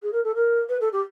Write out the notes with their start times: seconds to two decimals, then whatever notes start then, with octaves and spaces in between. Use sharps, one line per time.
0.02 G#4
0.12 A#4
0.23 A4
0.35 A#4
0.69 B4
0.80 A4
0.92 G4